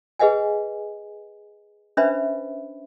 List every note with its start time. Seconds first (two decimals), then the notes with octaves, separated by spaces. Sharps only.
0.19 G#4 B4 D#5 F#5 G#5
1.97 C#4 D4 B4 C5 E5 B5